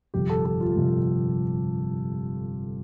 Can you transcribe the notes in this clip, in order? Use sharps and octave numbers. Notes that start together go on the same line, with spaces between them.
G1 F2 C3 G4
A4
A4
F4
G1 F2 C3